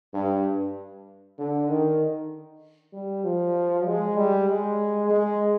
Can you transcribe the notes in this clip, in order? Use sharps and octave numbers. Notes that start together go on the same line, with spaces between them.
G2
D3
D#3
G3
F3
G#3
G3
G#3
G#3